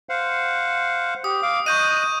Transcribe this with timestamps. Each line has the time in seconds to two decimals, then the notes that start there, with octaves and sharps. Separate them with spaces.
0.09 C5 F5 F#5
1.24 G4 D#6
1.43 F5 D6
1.66 D#5 C#6 F#6 G6 D#7